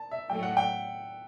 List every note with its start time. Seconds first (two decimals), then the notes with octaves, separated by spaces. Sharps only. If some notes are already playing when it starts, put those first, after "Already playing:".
Already playing: A5
0.11 E5
0.30 A2 F#3 A3 G5
0.43 F#5
0.57 G5